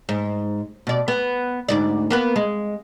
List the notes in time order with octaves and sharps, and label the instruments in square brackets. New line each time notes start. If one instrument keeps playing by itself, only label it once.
[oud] G#2
B2 D5
B3
D2 G#2 D5
A#3 B3 B4
G#3